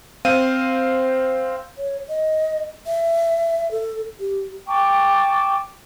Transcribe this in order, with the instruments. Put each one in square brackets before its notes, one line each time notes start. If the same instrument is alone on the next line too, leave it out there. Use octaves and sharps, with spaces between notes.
[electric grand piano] C4 C5 F5 D#7
[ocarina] C#5
D#5
E5
A4
G4
[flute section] G5 A5 C#6 D6